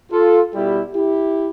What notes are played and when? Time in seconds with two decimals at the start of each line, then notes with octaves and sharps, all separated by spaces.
0.11 F4 A4
0.52 B2 G3 E4 G4
0.93 E4 G4